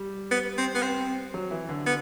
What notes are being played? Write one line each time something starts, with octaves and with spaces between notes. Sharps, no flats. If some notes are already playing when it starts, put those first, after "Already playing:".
Already playing: G3
B3
C4
B3
C4
F#3
E3
D3
B3